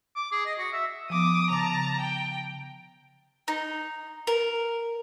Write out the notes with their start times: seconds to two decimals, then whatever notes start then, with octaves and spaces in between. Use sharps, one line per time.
0.16 D6
0.32 G#4
0.45 D#5
0.58 F#4
0.72 E5
1.10 F3 B3 D6 D#6
1.50 C#3 A5 A#5
2.00 G5
3.48 D#4
4.27 A#4